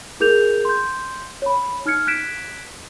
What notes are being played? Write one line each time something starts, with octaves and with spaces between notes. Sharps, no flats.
E4 G#4 A#4 G6 F7
C6 G6
C#5 B5
D#4 F6 G#6 C#7
F#6 G#6 B6 D7 E7